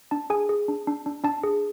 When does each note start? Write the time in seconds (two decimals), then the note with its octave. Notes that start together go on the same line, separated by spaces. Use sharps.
0.11 D4 A5
0.30 G#4 G#5
0.49 G#4
0.68 D4
0.87 D4
1.06 D4
1.24 D4 A5
1.43 G#4